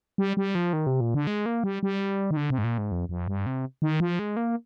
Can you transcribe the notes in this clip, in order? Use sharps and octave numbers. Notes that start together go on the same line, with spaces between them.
G3
G3
F3
D#3
C3
A#2
D3
G#3
A#3
G3
G3
D#3
D3
C3
G#2
A#2
G#2
F2
F2
G2
C3
D#3
F3
G#3
A#3